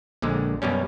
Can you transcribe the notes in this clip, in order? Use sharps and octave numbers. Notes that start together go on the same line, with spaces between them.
A#1 A#2 D3 G#3
F#2 B2 G3 C#4